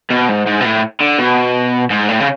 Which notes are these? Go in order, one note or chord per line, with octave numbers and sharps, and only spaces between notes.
B2
G#2
G#2
B2
A2
D3
B2
G#2
A2
C#3